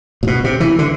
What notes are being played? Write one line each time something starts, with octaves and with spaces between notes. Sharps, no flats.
A#2
B2
C3
E3
D3